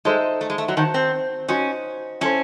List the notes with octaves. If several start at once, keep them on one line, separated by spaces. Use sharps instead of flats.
G#3 D#4 A4 C5 E5
A3
G#3
A3
F#3
D#3 F#4 C5 F#5 A5
C4
C#4 D#4 F#4 C5
C#4 E4 A4 C5